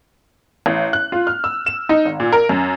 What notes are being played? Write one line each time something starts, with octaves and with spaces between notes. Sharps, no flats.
A1
F#6
F4
F6
E6
E7
D#4
G#1
A#2
A#4
F#2